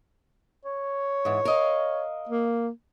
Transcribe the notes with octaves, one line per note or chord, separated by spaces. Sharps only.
C#5
G#2 E3
A#4 D#5 F5
A#3